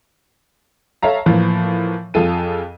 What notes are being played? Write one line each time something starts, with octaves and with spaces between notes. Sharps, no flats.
A4 C#5 E5 F5 A#5
A2 E3 F3 A#3
F2 F4 G#4 A4 D#7